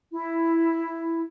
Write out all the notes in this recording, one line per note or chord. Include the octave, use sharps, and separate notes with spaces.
E4